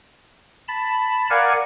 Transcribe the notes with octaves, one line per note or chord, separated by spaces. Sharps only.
A5 B5
A#4 D5 F5 F#5 G#5